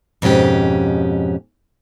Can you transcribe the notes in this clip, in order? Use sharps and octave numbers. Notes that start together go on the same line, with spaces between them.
F2 G#2 B2 C#4 G4